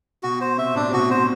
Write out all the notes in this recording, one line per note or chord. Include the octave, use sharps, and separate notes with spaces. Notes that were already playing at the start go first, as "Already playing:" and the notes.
B2 F#4
C5
C3 E5
A2 D4
C3
B2 F#4
C3 C5